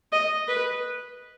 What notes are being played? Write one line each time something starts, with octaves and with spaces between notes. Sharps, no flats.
D#5
B4